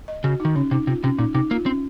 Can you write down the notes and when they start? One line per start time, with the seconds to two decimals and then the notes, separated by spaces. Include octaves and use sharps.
0.08 D#5
0.24 C#3 F#4
0.40 D#3 D#4
0.55 C#3 C#4
0.71 C3 D#4
0.87 C3 F4
1.03 C3 C#4
1.19 A#2 D#4
1.35 C3 D#4
1.51 A#3 F4
1.66 C4 C#4